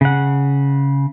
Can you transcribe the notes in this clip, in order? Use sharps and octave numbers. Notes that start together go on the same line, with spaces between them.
C#3 F#5